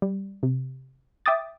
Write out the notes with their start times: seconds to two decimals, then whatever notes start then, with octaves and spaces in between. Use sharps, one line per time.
0.02 G3
0.43 C3
1.26 E5 G5 D6 D#6 A6